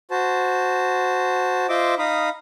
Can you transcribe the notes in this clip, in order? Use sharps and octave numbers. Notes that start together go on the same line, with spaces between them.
F#4 C5 A5
F4 C5 D#5 E5 C6 D6
D#4 F5 B5 D#6